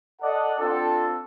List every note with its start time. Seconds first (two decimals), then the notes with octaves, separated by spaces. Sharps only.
0.22 A4 D5 D#5 F#5
0.59 C4 D4 F4 A4